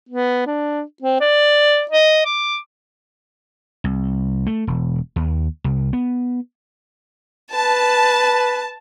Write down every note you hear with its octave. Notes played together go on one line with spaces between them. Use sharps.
B3
D4
C4
D5
D#5
D6
C2
A3
E1
D#2
C2
B3
B4 A5